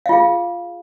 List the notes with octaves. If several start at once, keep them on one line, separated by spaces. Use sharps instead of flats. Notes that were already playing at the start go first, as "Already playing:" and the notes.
F4 G#4 F5